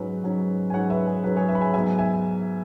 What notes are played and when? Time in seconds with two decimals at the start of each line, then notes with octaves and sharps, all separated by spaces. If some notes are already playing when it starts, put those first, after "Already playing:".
Already playing: G#2 F#3 C#4 B4
0.24 G#2 F#3 C#4
0.70 G#5
0.74 G#2 F#3 C#4 C#5 F#5
0.90 B4 E5
1.07 G#4
1.24 G#2 F#3 C#4 B4
1.36 G#4 C#5
1.48 B4 E5
1.55 B5
1.61 E5 G#5
1.74 G#2 F#3 B3 E5 G#5
1.99 E5 G#5